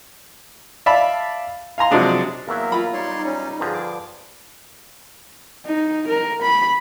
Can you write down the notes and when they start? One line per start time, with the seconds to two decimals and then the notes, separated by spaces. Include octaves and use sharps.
0.86 D5 E5 F5 A5 B5
1.78 F5 G#5 A#5 C6
1.91 C3 F3 F#3 G#3 D4 G#4
2.48 E2 F#3 A#3 A#4 E5
2.72 F4 B5
2.94 G3 D#4 C#5 D5 C6
3.25 C#4
3.60 G2 D3 F3 G#4 A#5
3.73 D6
5.65 D#4
6.07 A#4
6.42 B5